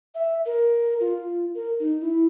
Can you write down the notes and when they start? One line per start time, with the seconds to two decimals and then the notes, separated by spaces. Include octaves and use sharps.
0.15 E5
0.46 A#4
1.00 F4
1.55 A#4
1.80 D#4
2.01 E4